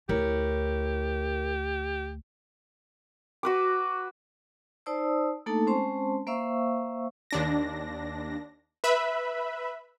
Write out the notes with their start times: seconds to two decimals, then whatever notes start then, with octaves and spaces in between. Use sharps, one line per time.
0.09 D2 E4 G4 A#4 C#5
3.43 F#4 B4 D6
4.86 D#4 C5 D5 A5 D#6 E6
5.46 A3 A#3 D4 D#4 A4 A5
5.67 G#3 C4 C#4 C5 A5 C6
6.27 A#3 C5 E5 F5 C#6 E6
7.31 D#2 D4 A#6
8.84 B4 E5 B5